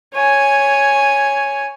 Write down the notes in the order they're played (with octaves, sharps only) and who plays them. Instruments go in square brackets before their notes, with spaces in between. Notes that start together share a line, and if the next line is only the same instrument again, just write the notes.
[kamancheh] C#5 G#5